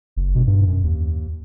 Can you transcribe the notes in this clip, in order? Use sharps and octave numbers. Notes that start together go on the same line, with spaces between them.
F#1
B2
G2
F#2
D#2